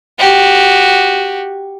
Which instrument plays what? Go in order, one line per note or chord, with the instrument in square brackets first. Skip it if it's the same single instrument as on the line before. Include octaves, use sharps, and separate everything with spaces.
[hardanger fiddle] F#4 G4